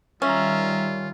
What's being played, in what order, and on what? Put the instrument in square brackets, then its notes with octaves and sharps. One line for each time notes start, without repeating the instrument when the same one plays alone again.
[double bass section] D#3 G3 [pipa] C#4 [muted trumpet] F4 [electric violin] E5 A#5